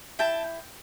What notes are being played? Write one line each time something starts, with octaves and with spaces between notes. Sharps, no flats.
E4 G5 A5